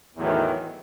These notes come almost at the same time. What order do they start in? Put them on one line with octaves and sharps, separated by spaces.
E2 A2 F#3 E3 D#3